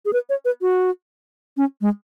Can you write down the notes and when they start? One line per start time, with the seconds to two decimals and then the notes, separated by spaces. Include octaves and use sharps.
0.05 G#4
0.13 B4
0.29 C#5
0.45 B4
0.61 F#4
1.57 C#4
1.81 G#3